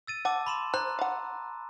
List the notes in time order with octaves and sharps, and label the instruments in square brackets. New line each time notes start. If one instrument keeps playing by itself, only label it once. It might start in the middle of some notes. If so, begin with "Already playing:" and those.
[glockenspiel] E6 A6 D#7
[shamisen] F#5 [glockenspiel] A5 D6 E6
[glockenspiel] B5 C6 E7
[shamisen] C5 [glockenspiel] A#5 C6 F#6
[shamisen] F5 F#5